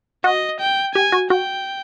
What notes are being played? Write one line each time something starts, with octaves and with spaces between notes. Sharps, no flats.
F#4 D#5
G5
G4 G#5
F#4
F#4 G5